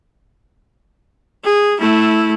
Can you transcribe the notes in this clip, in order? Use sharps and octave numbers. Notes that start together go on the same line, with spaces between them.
G#4
A3 E4